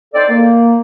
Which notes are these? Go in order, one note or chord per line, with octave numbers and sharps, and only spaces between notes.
C4 D#4 A4 C5 D5
A#3